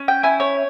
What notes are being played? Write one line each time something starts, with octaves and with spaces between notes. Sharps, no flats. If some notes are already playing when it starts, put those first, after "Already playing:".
Already playing: C#4
G5
E4 G#5
C#5